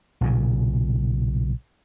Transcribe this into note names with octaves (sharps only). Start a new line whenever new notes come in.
B1 A#2 C#3